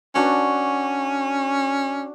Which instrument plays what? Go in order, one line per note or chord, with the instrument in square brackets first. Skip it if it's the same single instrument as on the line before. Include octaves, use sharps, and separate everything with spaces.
[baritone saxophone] C#4 [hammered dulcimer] D4 F#4